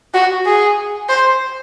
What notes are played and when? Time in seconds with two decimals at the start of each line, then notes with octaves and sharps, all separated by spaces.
0.14 F#4
0.46 G#4
1.09 C5